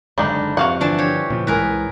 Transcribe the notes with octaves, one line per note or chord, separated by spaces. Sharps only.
F#1 G#2 D3 G3 D4 D#4
F2 C3 F#4 F5 F#5
G1 D3 E3 F3 D4 A5
G4 C#5
A#2 C#3 F3
C2 G#2 E3 G#4 A#4 B4